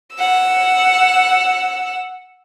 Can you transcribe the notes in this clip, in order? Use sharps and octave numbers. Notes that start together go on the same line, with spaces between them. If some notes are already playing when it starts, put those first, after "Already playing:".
F#5 E6